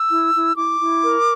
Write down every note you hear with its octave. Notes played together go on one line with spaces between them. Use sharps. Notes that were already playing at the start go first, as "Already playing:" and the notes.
Already playing: E6
E4
E4
E4 D6
E4
A#4